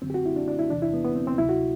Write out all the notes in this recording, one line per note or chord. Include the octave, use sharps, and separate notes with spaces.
F#2 D3 F#3 C4
G4
F#4
E4
D4
D4
E4
E2 C3 E3 D4
E4
B3
B3
C4
C4
D2 C3 F#3 E4
F#4